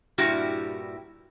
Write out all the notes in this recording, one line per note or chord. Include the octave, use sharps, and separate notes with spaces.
G2 A#2 G3 E4 F#4 G4